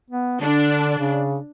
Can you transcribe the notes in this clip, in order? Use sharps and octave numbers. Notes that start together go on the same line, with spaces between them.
B3
D3 D4
C#3